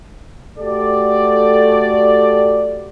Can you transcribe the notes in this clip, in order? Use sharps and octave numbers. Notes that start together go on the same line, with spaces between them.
A3 F#4 G4 A4 D5